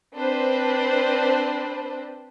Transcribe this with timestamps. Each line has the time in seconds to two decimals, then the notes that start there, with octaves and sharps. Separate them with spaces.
0.16 C4 D4 B4 C5